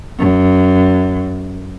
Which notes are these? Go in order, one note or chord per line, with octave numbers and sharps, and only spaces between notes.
F#2